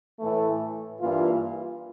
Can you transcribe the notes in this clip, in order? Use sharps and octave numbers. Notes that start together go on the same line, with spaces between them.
A2 E3 A3
G2 E3 A#3 F4